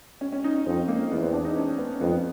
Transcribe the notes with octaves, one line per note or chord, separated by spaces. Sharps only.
C#4
C#4
D#4
C#4
F2 C4
A#3
E2 B3
C4
D4
D#4
C#4
B3
F2 B3